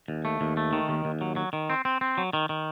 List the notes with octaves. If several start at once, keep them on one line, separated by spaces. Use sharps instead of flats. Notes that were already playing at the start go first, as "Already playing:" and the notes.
D#2
A3
D#2
A3
D#3
D#2
D#2
F#3
F#3
D#3
C4
C4
C4
F#3
D#3
D#3